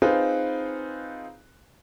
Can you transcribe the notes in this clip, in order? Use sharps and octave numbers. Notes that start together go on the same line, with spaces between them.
C4 D#4 F4 G#4 B4